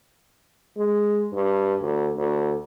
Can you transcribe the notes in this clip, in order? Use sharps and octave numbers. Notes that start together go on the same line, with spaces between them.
G#3
G2
D2
D2